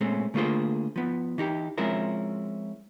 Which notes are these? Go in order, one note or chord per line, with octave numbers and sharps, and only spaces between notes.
A#2 G#3 A3 C4 C#4
D3 A3 A#3 F4 G#4 C5
F3 B3
E3 D#4 G4
F3 G#3 C4 C#4 E4 A#4